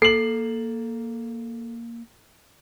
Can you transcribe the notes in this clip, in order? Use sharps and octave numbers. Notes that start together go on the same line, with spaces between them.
A#3 A4 C7 F#7